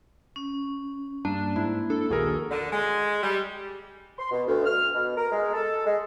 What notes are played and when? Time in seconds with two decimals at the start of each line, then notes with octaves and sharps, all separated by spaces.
0.36 C#4
1.25 G2 A#3 D4
1.56 G#2 E4
1.90 D4 A4
2.10 A#1 D#2 A#2 F#4 G#4 A#4
2.50 D3
2.72 G#3
3.22 G3
4.18 C6
4.31 B2
4.47 D2
4.65 F6
4.93 B2
5.17 A#4
5.32 G#3
5.53 A4
5.85 G#3